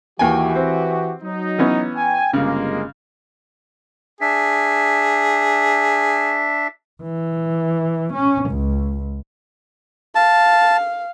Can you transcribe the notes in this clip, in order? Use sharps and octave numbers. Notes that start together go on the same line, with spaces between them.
D#2 E3 F#4 G4 G5 G#5
C4
F#3 D#4
E3 B3 C#4
G5 G#5
G1 C#3 G#3 A#3
D4 G#4 E5
E3
C#4
C#2
F5 A5